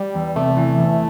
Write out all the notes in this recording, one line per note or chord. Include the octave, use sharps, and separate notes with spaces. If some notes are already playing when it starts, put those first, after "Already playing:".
Already playing: G3
E2
C3 A3
E3
E2